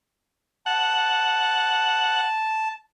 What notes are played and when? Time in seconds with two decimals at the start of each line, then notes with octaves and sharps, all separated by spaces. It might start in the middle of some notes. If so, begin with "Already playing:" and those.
0.66 F#5 A5